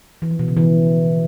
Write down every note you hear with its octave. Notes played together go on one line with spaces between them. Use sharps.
E3
F3
B2
C#3
E3